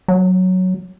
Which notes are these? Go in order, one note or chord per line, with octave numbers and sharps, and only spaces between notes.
F#3